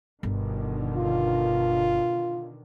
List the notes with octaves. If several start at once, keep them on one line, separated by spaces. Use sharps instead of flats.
G1 B2 D3 D#3
F4